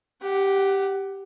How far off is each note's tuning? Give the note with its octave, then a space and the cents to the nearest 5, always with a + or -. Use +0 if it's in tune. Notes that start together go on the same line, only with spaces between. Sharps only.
G4 +0 F#5 +25